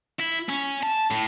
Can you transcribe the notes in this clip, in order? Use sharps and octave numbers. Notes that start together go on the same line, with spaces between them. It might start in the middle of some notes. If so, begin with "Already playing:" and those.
E4
C#4
A5
A2